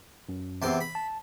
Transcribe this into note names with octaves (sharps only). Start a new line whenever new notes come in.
F#2
E2 C3 C6
B5
A5